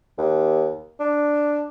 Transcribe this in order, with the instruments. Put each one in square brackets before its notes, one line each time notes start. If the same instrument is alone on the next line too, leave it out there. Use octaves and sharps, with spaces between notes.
[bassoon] D#2
D4